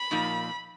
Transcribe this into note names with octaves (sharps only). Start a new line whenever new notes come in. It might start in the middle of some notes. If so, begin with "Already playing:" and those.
Already playing: B5
A#2 F3 A#3 D#4